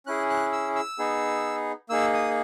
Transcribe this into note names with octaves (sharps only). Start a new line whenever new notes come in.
C#4 E4 G#4 F#6
F#6
E6
E6
B3 D#4 G#4
A#3 D#4 G#4 E6
D#6